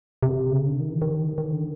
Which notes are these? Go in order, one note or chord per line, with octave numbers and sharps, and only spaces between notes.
C3
C#3
D3
D#3
E3
D#3
D#3
D3